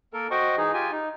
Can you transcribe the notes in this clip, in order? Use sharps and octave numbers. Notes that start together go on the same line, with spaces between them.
A#3 A4 A#4
F#4 C5 D#5 G5 C#6
E3 D#4 G#4
F4 G4 G#5
D#4